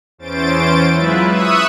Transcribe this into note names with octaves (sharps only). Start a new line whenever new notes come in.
E2 E3 C#4 C5 A6 D7
F#3 G#3 E4 F4 B4 E5
E5 C#6 D#6 E6 F#6 D#7